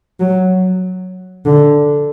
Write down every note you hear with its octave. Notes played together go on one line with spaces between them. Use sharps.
F#3
D3